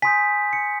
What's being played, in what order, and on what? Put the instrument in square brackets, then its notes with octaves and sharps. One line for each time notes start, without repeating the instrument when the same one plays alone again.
[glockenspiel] G#5 C6 D#6 G6 B6
C#7